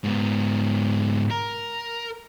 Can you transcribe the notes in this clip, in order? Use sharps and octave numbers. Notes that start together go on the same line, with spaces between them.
G#2 B3
A#4